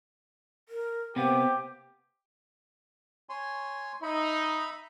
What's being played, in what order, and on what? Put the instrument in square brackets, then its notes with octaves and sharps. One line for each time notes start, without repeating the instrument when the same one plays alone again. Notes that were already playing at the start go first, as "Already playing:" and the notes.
[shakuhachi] A#4
[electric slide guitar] C3 A#3 B3 [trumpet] G4 [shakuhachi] C5
[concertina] C#5 G#5 C6
[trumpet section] D#4 [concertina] E5 B5